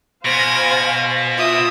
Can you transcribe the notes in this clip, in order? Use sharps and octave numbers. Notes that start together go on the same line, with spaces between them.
B2 C5 F5 G#5 G#6 A#6
F4 C5 E5 D#6